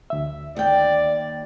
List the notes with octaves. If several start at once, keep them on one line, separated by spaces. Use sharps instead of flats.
D2 E5
D#2 D5 G5